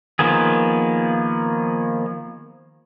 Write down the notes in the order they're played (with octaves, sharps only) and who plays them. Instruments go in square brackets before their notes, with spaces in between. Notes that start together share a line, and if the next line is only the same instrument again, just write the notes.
[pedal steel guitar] D#3 F3 A#3 B3 G#4